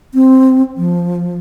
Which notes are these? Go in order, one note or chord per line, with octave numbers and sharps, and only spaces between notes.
C4
F3